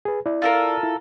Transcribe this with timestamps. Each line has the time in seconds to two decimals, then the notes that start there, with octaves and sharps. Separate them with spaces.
0.05 G#4 B4
0.26 E4 D5
0.42 F4 A4 A#4
0.83 E4